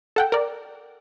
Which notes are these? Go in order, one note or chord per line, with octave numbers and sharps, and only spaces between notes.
A4 F#5 G5
A#4 D5